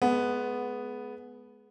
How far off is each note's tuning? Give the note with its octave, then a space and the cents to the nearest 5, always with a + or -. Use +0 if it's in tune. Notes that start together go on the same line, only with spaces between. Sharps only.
G#3 +30 B3 +0